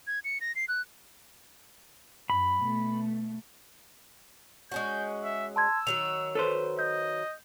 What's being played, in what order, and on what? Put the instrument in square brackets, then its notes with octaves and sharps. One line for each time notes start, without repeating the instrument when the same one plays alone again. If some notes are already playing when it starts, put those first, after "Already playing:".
[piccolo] G#6
C#7
A#6
C7
F#6
[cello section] F#2 [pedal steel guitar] B5
[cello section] B2 A3
[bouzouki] G#3 C#4 F#4 [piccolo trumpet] G6
[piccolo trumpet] E5
[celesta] A5 C6 G#6 [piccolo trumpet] E6
[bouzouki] D#3 F#3 F#4 [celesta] F7
[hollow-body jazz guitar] A4 B4 C5
[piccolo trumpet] D#5 [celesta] G6